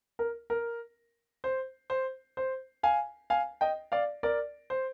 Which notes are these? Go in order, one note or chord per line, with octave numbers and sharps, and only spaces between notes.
A#4
A#4
C5
C5
C5
F5 G#5
F5 G#5
D#5 G5
D5 F5
A#4 D5
C5